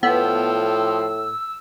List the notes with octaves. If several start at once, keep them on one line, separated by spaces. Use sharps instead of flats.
A2 F3 B3 G5 E6